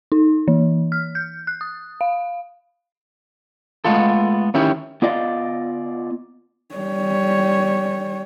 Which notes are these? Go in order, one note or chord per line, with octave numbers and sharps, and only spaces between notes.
D#4
E3
F6
G6
F#6
D#6
F5
G#3 A3 B3 F4 A4
D#3 C#4 E4 G4
B3 F4 D5 D#5 F5
G3 C#5